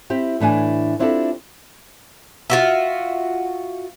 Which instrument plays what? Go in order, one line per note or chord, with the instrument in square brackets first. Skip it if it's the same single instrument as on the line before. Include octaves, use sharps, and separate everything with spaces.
[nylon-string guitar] C4 E4 G4
A2 E3 D4 G#5
C4 D4 E4 F4 G4 A4
[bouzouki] F4 F#4 E5